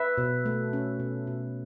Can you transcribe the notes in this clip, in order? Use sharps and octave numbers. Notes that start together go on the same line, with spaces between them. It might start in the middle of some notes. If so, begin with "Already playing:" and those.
Already playing: B4 E5
B2
A3
C#4
B2
B2